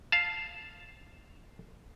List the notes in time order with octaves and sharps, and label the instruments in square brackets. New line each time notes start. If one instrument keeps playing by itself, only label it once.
[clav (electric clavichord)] F5 A5